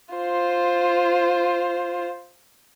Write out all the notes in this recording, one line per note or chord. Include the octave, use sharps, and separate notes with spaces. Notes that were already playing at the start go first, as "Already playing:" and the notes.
F4 C5